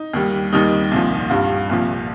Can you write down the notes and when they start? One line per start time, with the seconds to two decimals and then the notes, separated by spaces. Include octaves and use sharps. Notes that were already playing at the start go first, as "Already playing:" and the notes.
Already playing: D#4
0.13 D#2 D#3 G3
0.53 D#2 D#3 G3 D#4
0.92 C2 A#2 F3
1.30 G2 G3 F4
1.69 C2 A#2 F3